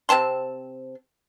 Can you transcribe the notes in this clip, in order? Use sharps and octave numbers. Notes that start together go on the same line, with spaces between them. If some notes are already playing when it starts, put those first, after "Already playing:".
C3 C4 A5 C6